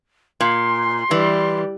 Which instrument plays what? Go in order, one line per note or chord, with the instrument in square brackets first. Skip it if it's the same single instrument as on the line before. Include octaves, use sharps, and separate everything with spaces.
[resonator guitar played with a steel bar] A#2 [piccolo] C6
[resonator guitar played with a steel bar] E3 [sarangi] G3